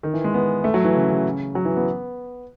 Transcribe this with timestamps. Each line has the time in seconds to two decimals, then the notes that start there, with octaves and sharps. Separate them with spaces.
0.03 D#3
0.14 E3
0.24 G#3
0.34 B3
0.64 A3
0.74 F#3
0.84 E3
0.95 C#3
1.09 C#3
1.55 F#3
1.65 E3
1.76 B3